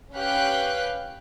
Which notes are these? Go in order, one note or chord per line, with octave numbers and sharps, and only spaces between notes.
C#4 G4 B4 F5 G5 F#6